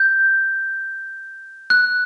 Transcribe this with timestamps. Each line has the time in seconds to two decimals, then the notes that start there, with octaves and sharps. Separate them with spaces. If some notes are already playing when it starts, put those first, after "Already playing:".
Already playing: G6
1.70 F#6